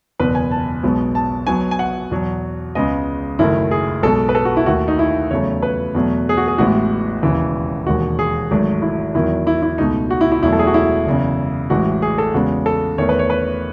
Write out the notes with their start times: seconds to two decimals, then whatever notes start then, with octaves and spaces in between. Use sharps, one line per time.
0.19 F#1 E2 B2 B4
0.35 G#5
0.51 A5
0.83 B1 B2 G#3 B3
1.15 A5
1.47 B1 B2 F#3 B3 G#5
1.71 G#5
1.79 F#5
2.11 E2 B2 F#3
2.75 C#2 C#3 G#3 B3 D#5
3.39 F#1 F#2 D#3 A3 E4
3.71 G#4
4.03 B1 B2 G#3 A4
4.29 B4
4.35 A4
4.45 F#4
4.57 E4
4.66 D#2 D#3 A3 F#4
4.88 D#4
4.99 E4
5.30 E2 C#3 F#3 A3 C#5
5.63 B4
5.95 E2 B2 F#3 A3
6.29 G#4
6.37 F#4
6.48 G#4
6.58 A1 A2 E3 G#3 B3 F#4
7.23 E1 D#2 C#3 E3
7.86 E1 D#2 D#3 G#3 F#4
8.19 G#4
8.51 G#1 G#2 F#3 A3
8.82 E4
9.14 E2 D#3 F#3 E4
9.47 E4
9.62 E4
9.78 C#2 B2 A3 D#4
10.10 F#4
10.21 E4
10.32 E4
10.43 E1 E2 B2 F#3 A3 E4
10.52 A4
10.59 G#4
10.67 F#4
10.74 E4
11.06 F#1 E2 C#3
11.70 A1 A2 E3 G#3 F#4
12.02 G#4
12.18 A4
12.34 E2 C#3 G#3 B3 F#4
12.66 A4
12.98 E2 D#3 A3 C#5
13.09 B4
13.19 C#5
13.30 B4